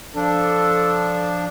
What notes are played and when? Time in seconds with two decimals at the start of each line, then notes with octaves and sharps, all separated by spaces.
0.15 F3 D4 A4